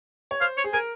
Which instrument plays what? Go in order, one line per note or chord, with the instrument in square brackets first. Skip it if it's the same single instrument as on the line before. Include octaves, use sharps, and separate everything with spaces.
[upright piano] C#5
[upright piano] C5 [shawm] F5
[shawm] C#5
[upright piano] G#4
[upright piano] A#4 [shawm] G#5